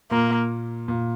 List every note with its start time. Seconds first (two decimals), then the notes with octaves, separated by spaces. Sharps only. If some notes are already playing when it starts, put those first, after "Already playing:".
0.11 A#2 A#3
0.88 A#2